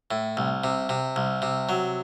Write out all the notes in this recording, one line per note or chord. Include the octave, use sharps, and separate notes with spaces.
A2
C2
C3
C3
C2
C3
F#3